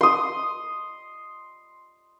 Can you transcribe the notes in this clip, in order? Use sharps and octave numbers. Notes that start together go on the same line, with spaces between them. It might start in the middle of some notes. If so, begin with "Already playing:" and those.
C6 D#6